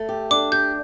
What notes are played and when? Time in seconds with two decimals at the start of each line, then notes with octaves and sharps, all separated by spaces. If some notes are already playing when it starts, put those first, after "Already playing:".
Already playing: A3
0.09 G4
0.31 D4 D6
0.52 G4 G6